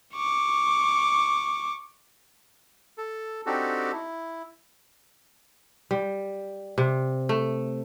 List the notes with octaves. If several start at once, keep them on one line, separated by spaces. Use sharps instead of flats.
C#6 D6
A4
C4 D4 D#4 F#4 G4 A4
E4
G3
C3
A3